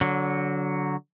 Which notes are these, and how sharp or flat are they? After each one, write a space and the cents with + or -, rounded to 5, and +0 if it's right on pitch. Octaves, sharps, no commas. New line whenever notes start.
D3 -20 F#3 +0